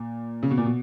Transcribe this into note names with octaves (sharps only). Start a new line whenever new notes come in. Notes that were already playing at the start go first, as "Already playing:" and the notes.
Already playing: A#2
C#3
B2
A#2
B2